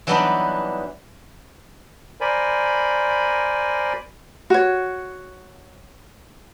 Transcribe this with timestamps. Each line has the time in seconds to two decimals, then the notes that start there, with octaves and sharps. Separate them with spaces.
0.07 E3 F#3 G3 B3 D4 D#4
2.21 A#4 C5 D5 G#5 B5
4.50 F#4 C#5